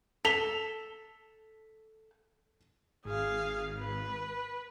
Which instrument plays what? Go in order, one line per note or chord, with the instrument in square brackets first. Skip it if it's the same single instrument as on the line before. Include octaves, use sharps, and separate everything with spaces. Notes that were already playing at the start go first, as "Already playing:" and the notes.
[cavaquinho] A4 [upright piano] B6 F7 G7
[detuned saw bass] G#1 [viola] G#4 F5
[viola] B4